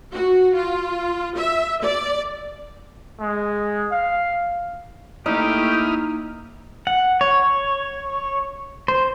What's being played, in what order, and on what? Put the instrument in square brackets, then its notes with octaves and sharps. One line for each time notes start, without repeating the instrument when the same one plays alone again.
[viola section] F#4
F4
E5
D5
[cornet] G#3
F5
[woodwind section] A3 G4 [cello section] A#3 [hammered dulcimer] D#4 [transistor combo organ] E4 D#6 F6
[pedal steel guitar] F#5
C#5
C5